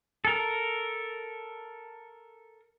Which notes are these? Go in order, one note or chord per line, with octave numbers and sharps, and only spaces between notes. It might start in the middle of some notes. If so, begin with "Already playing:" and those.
A4 A#4